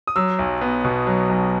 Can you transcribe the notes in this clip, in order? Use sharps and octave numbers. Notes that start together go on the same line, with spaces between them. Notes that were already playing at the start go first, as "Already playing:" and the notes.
D#6
F#3 E6
B1
B3
B2
F#3
B1